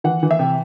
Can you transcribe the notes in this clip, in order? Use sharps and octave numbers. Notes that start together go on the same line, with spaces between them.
E3 F#5
E3
E5
C3